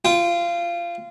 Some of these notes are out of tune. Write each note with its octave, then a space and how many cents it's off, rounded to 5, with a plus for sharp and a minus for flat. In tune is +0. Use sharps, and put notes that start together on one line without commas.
F4 -20 G5 +0